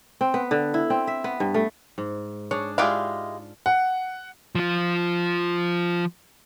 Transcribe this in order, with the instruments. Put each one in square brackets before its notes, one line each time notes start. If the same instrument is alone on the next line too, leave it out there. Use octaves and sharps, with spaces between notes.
[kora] C4
B3
D3
E4
C4
E5
B3
G2
A3
G#2
[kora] D4 G#4 [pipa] C#5
[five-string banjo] G#3 G4 E5 [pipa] D4 E4 F5 [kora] F4
[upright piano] F#5
[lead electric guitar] F3 F4